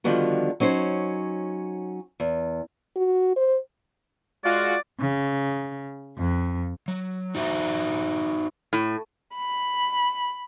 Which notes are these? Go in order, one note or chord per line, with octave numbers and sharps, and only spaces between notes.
D3 D#3 F3 G3 B3 F#4
F#3 C#4 D#4 C5
E2
F#4
C5
G#3 F4 F#4 D5
C#3
F2
F#3
D#4 F#4 C5 E5
A2
B5